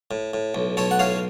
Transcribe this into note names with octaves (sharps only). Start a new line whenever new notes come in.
A2
A2
B1
B1 A4 C#5
F#5
A2 C#5 F5